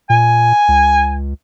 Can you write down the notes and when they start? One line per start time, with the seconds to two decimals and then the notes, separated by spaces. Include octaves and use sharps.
0.10 A#2 G#5
0.68 C#2